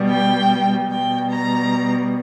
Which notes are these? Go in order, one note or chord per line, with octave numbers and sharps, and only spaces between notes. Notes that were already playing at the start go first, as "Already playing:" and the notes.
Already playing: B2 G3
G5
B2 G3 G5
A#5